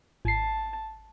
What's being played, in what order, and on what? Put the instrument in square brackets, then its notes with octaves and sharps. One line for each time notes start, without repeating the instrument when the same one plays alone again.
[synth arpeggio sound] G#1 C7 [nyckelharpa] A5